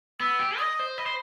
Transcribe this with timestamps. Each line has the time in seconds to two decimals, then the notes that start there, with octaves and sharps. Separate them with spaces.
0.20 B3 E6
0.39 G4
0.59 D#5 D#6
0.79 C5
0.98 D#5 B5
1.06 C5